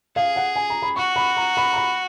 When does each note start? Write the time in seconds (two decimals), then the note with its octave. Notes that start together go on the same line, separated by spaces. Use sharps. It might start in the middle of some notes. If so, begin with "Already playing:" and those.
0.16 G#4 F5
0.36 F#5
0.56 G#5
0.70 A#5
0.82 B5
0.96 F#4 C#6
1.16 B5
1.37 A#5
1.57 B5
1.72 A#5
1.76 B5